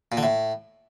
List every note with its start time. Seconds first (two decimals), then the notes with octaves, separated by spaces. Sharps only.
0.12 A#2
0.17 D3
0.23 A2